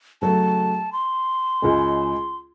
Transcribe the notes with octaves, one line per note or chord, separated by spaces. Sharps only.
C#3 F#3 A3 A5
C6
C#2 C#3 G#3